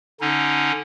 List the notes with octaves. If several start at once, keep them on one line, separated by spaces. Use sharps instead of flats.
D3 C#4 D#4